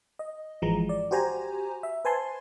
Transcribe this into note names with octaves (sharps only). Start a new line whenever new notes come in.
D#5
G#1 E3 F3 G#3 A#5
D5
F#4 G4 C5 G#5 A#5
E5
B4 C5 G#5 A5 C6